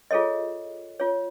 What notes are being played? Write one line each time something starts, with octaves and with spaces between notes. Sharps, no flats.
F4 G#4 A4 C#5 D#5
F4 C#5